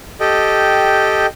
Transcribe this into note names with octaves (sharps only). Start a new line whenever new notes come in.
G4 A4 D#5 G5